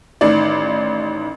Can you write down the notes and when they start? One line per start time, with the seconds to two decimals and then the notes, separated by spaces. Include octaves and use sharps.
0.21 A1 D#3 D5